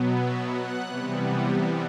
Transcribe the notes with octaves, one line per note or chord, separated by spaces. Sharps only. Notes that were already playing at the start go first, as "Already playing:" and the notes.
Already playing: B2 F#3 B3
E5 E6
F#5 F#6
C3 E3 G3 B3